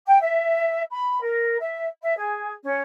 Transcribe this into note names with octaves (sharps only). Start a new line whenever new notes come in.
G5
E5
B5
A#4
E5
E5
G#4
C#4